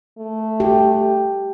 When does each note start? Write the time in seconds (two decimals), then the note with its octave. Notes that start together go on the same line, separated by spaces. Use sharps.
0.18 A3
0.60 G4